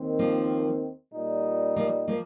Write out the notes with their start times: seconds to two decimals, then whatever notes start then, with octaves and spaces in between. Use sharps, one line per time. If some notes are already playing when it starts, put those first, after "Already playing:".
Already playing: D#2 D#3 C4
0.19 F3 A#3
1.13 A#2 G3 D#4
1.76 F3 A#3
2.08 F3 A#3